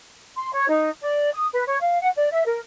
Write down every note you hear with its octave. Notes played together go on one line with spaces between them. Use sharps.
C6
C#5
D#4
D5
D#6
B4
C#5
F5
F#5
D5
E5
A#4